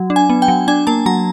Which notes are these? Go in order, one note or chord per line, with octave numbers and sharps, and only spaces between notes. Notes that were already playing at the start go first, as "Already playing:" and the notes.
Already playing: F#3
D4
G#5
B3
G5
F#3
D4 G#5
A#3 A5
F#3 A#5